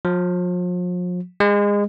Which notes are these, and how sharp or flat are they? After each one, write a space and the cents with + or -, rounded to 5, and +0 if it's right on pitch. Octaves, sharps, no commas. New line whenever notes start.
F3 +40
G#3 -25